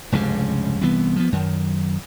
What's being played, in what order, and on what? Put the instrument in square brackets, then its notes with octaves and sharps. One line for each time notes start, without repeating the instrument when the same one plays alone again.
[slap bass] F1 C#2 G2 C#3
C2 E3 B3
F3 B3
F#2 D#3